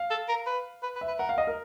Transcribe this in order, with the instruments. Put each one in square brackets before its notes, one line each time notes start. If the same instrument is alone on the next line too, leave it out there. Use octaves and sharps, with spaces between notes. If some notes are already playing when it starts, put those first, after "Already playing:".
Already playing: [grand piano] F5
[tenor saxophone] A4
A#4
B4
B4
B4
[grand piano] E5
[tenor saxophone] B4
[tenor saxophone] A#4 [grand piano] F#5
[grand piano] F5
D#5
A#4